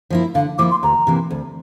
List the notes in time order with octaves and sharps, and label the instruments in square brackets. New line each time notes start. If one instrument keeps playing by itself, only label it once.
[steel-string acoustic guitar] F3 A#3 E4
[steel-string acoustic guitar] D3 [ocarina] F5
[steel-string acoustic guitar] F3 A#3 E4 [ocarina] D6
[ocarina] C6
[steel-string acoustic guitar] D2 [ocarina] A#5
[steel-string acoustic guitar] C3 E3 A#3
D2